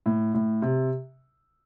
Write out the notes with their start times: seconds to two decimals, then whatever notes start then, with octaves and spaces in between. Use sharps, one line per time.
0.06 A2
0.34 A2
0.62 C3